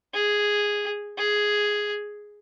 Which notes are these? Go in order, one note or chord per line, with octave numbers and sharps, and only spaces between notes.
G#4
G#4